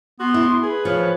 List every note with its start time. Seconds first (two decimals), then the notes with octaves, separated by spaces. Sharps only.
0.20 B3 F#4 C6
0.34 E4
0.62 G#4 B4
0.85 F3 C#5